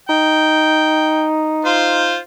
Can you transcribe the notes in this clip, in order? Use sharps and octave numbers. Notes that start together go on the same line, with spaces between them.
D#4 G5
F4 C5